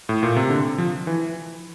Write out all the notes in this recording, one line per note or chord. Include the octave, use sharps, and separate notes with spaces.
A2
A#2
C3
D3
F3
E3